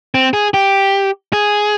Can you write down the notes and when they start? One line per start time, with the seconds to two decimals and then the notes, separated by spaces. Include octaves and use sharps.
0.14 C4
0.34 G#4
0.54 G4
1.33 G#4